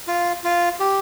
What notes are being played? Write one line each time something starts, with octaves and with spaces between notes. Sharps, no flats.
F4
F4
G4